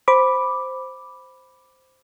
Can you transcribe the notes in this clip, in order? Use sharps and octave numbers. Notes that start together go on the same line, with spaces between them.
C5 B5 D6